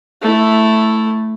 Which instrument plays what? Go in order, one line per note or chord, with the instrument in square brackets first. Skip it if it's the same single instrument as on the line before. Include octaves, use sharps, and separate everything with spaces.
[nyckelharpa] A3 E4